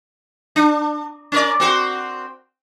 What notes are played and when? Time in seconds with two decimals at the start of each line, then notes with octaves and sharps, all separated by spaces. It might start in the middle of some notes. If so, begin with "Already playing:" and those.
0.56 D4
1.32 C#4 A#4 D5
1.60 C4 F#4 C5